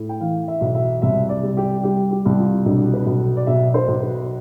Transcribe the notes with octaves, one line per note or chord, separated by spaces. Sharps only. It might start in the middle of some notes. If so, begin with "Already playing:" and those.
Already playing: A2
G5
E3 F5
E5
B1
E5
C2 E5
D5
G3
G4
G3 G4
G4
C2
F4
B1 D4
B4
B1
D5
B2 E5
C5
B1
B4